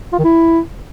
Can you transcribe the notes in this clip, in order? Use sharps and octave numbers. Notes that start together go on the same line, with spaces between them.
F4
D#3
E4